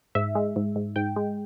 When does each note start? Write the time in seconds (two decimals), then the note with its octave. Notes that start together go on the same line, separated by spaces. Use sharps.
0.15 G#2 E5
0.35 G#3
0.56 G#2
0.76 G#2
0.96 G#2 G5
1.16 G#3